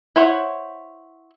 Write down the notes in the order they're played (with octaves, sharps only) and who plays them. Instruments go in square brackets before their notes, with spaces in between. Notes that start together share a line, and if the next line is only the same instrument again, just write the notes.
[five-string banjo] E4 C5 C#5 F#5